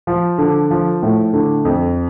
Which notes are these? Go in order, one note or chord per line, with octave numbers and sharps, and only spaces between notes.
F3
D3
F3
A2
D3
F2